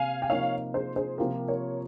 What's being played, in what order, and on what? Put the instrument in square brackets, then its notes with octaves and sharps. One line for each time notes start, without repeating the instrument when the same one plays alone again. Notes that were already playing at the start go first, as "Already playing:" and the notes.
Already playing: [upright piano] C3 A#3 [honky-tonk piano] F5 G#5
[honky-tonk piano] G5
[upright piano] C3 F3 A#3 D#4 [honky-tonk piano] C#5 F5
[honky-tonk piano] G#4 C5
G#4 C5
[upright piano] C3 F3 A#3 F4 [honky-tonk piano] G4 A#4
[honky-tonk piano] A#4 C#5